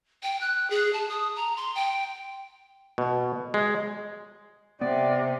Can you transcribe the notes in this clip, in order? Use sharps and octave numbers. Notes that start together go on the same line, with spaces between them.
G5
F#6
G#4
A5
D#6
A#5
C6
G5
B2
G#3
C3 B3 D5